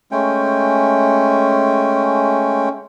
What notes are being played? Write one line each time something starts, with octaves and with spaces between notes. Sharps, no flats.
G#3 A3 C#4 G5